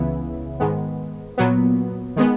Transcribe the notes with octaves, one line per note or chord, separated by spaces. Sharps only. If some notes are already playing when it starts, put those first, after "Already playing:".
Already playing: C#2 C#3 E3 B3 E4
G#2 D#3 G#3 B3
A#2 F#3 B3
D#3 G#3 B3